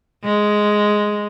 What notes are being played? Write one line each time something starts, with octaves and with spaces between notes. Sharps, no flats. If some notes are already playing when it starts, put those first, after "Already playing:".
G#3